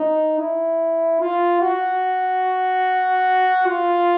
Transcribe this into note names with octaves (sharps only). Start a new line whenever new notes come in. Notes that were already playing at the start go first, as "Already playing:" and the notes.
Already playing: D#4
E4
F4
F#4
F4